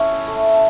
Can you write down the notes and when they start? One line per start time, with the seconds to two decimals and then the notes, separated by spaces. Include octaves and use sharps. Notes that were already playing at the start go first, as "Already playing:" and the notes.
Already playing: A3 C#4 E4 A5 B5
0.28 A3
0.54 A5